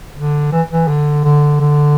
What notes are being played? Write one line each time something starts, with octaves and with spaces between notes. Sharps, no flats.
D3
E3
E3
D3
D3
D3